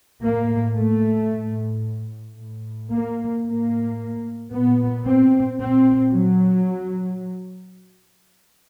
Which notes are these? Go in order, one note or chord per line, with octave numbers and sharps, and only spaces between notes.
A2 A#3
A3
A2
A2
A#3
A2 A#3
A#2 B3
C4
A#2 C4
F#3